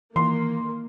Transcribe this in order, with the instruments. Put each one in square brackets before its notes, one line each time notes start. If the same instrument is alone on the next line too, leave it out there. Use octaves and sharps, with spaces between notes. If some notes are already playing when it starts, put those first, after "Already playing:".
[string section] D#3 A#3 [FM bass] E3 [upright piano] C6